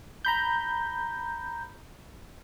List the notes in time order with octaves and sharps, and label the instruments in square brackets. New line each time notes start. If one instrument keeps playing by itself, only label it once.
[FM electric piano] A#5 B5 G6